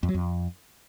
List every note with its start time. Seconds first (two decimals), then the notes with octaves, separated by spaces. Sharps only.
0.03 F2
0.09 F#3
0.14 F2